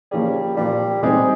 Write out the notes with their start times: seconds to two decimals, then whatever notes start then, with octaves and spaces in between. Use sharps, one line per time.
0.11 F3 G3 A#3 C#4 G#4
0.57 A#2 F3 G3 A#3
1.02 C3 G3 G#3 C4 D#4